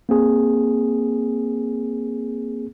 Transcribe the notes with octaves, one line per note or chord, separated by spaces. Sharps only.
A#3 C4 G#4